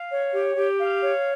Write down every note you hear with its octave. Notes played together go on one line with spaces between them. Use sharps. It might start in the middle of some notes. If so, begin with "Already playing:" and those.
Already playing: F5
C#5
G4
G4
F5
C#5